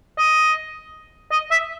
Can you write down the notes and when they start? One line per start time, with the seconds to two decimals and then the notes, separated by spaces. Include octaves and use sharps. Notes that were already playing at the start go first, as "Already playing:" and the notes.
0.18 D#5
1.31 D#5
1.51 E5